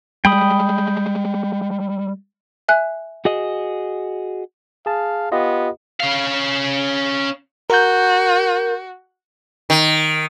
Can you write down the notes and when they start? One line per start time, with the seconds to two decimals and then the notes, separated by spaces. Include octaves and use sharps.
0.25 G3 G#3 G5 B5 D#6
2.68 E5 G#5 F#6
3.25 F#4 G#4 D#5
4.86 G#4 F5 A5
5.32 B3 F4 G4 D#5
6.00 C#4 F5
7.70 F#4 A#4 G6
9.70 D#3